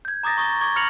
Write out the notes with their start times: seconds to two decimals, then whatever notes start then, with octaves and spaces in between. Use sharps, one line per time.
0.05 G6 G#6
0.23 A#5 D6 D#6 A6 A#6
0.37 A#5 C#6 D#6 G7
0.61 C#6 D6 G#6 G7
0.76 B5 F6 A#6 C#7 F7 F#7